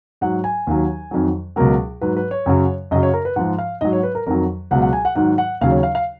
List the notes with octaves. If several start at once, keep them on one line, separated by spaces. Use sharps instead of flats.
G#2 F#3 F#5
G#5
D#2 D#3 F#3
F2 D#3 F#3
C#2 B2 F#3 A#4
G#2 F#3 B4
B4
C#5
F#2 C#3 F#3
F#2 C#3 F#3 D#5
C#5
A#4
B4
G#2 F3 F#5
F5
G#2 F#3 D#5
C#5
B4
A#4
F2 D#3 F#3 A#4
C#2 B2 F#3 F#5
F#5
G#5
F#5
G#2 D#3 F#3 F#5
F#5
D#2 C#3 F#3 F5
C#5
F5
F5